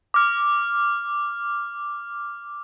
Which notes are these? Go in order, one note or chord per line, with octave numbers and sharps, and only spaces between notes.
D6 F6